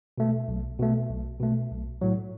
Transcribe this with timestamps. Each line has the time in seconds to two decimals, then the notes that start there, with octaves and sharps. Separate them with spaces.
0.18 B2 A3
0.48 B1
0.79 B2 A3
1.09 B1
1.40 B2 A3
1.70 B1
2.01 A2 F#3